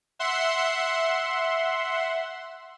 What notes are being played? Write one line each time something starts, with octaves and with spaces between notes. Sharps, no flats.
E5 F#5 C6